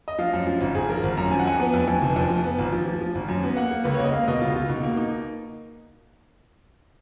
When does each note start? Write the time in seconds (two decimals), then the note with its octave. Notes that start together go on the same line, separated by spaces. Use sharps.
0.08 D#5
0.19 F3 F5
0.33 F#2
0.47 F3
0.61 G#1
0.75 G#1 G#4
0.89 F3 A#4
1.03 G#1
1.17 F#2 A#5
1.31 F3 G#5
1.39 F#5
1.46 F2 G#5
1.60 B3
1.74 F2
1.88 F2 G#5
2.02 F1
2.16 F2
2.30 F3
2.44 B3
2.59 G#1
2.73 F3
2.86 F3
3.01 F3
3.15 G#1
3.28 F#2
3.43 B3
3.57 A#3 F#5
3.71 A#3
3.84 C#2 B4
3.94 C#5
3.99 A#3
4.04 D#5
4.13 A#3 F5
4.28 B2 D#5
4.41 C#2 F4
4.56 C#2 F4
4.69 B2 D#4
4.83 A#3
4.97 D#4